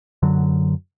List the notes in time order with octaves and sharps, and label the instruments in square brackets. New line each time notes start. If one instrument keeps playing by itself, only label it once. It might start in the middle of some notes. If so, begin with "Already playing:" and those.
[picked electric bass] F#2 D3 F#3